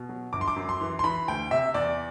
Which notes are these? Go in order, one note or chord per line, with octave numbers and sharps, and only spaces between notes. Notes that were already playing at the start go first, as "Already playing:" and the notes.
Already playing: B2
F#3
G1 D6
C6
D6
F#2
C6
E3
C6
E3 B5
D2 G5
C3 E5
E2 D5